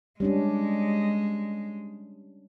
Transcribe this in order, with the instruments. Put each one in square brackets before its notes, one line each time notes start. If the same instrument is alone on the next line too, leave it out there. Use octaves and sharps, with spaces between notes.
[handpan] G3 C#4 D4 [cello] G#3